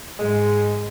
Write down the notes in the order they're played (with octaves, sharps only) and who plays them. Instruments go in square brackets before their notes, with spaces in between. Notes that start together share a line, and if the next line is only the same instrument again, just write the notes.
[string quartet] G#2 [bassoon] G#3